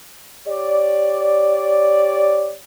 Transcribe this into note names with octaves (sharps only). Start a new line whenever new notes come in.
G4 C#5 D5